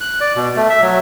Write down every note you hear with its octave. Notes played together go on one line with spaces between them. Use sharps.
F#6
D5
B2
A3
E5
F#3